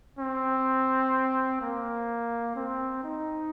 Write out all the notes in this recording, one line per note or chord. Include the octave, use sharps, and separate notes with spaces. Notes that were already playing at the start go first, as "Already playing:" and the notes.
C4
A#3
C4
D#4